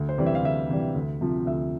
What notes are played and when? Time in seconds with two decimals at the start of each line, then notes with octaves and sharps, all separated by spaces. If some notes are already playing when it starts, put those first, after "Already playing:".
Already playing: D2
0.09 C5
0.18 C3 E3 G3
0.26 E5
0.35 F5
0.43 D2 E5
0.69 C3 E3 G3
0.94 D2
1.21 C3 F3
1.46 D2 E5